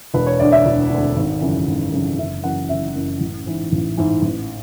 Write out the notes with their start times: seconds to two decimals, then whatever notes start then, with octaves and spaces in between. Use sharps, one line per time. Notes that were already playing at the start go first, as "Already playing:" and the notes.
0.14 E1 B4
0.27 C#5
0.40 D2 D3 D5
0.52 E5
0.65 E1
0.90 D2 D3
1.16 G#1
1.41 F#2 C#3 E3
1.67 G#1
1.92 F#2 C#3 E3
2.17 F#1 E5
2.44 F#2 E3 F#5
2.69 F#1 E5
2.95 F#2 E3
3.20 A1
3.46 G#2 E3
3.72 A1
3.97 G#2 E3
4.22 A1